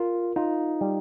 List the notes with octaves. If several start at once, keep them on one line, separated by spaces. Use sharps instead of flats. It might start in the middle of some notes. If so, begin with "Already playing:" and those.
Already playing: F4 A#4
D#4 F4
G3